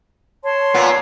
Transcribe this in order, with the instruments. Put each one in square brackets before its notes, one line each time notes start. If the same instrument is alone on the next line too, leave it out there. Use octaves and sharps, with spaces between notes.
[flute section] C#5 A5 C6
[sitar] A#2 B3